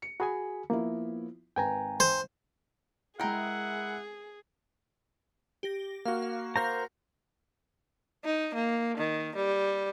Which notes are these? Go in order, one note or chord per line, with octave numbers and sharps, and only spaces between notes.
C#7
F#4 G#4 G#5 B5
F3 A#3 B3 E4
G#1 B4 G5 G#5 A#5
C5
G#3 E4 G#4 A#4 E5 F#5 G5
G4 A#6
A#3 F#4 F5 F6
F5
A#4 C5 F5 A#5 G6 A#6
D#4
A#3
D#3
G3